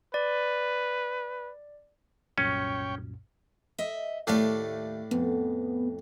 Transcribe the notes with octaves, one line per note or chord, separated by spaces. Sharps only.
B4 D5
C2 F#2 A#2 C#4 C#5 G5
D#5 E5
D#2 A2 A3 D4 F5
F2 B3